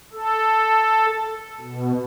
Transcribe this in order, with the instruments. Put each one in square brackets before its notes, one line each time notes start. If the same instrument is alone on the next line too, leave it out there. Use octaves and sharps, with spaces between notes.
[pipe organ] A4
B2